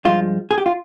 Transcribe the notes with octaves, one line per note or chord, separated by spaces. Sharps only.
G2 F3 G#3 F4
G#4
G4
F4